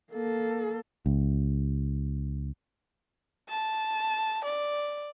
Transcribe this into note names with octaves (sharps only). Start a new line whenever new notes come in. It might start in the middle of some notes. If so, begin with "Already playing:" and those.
A#3 A4
C#2
A5
D5